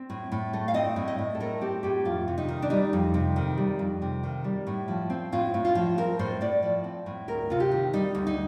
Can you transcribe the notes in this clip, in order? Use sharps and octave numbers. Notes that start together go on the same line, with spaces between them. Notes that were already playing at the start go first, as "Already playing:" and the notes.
Already playing: C4
A2
A2
A3
F5
C4 D#5
A2
D#5
A2
A4
A3 A#4
C4 G4
A2 G4
F2 F4
C3
D#4
D#3
D4
G3 D#4
F2
C3
D#3
G3
F2
C3
D#3
G3
A2
F3
C4
A2 F4
A2
F4
F3
C4 A#4
A2 C5
A2 D5
F3
C4
A2
D2 A#4
C3 F4
G4
D#3
G3 D#4
D2
D#4